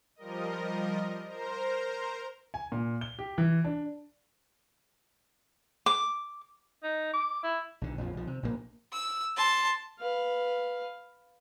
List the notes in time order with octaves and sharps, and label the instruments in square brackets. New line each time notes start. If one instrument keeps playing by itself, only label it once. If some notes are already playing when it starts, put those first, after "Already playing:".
[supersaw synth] F3 G3 A#4 D#5
A#4 C5 A#5
[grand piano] G#5
A#2
G7
G4
E3
D4
[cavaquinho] D6
[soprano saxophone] D#4
D6
E4
[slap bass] B1 D3
A#1 F2 F3
B1 F3
C3
A#1 A2 D3 A#3
[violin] E6
A5 C6
[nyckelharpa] B4 F5